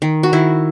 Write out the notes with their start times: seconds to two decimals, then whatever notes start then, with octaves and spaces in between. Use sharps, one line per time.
0.02 D#3
0.23 F#4
0.33 D#3 E4